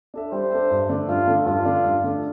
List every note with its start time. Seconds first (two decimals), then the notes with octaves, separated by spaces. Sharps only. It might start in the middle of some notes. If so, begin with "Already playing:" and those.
0.14 D4 A4 E5
0.32 G3 C5
0.51 D4 A4 E5
0.71 G2
0.89 D3 A3 D4 A4
1.08 G2 F4
1.27 D3 A3 D4 A4
1.46 G2 F4
1.65 D3 A3 D4 A4
1.84 G2
2.04 D3 A3 D4 A4